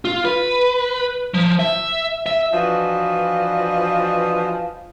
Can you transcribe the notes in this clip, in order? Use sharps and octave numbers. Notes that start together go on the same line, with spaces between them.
F4
B4
F3
E5
E5
E3 F3 D4 F#4 B4 D#5